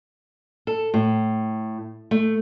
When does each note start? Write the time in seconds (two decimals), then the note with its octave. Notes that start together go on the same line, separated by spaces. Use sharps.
0.67 A4
0.94 A2
2.11 A3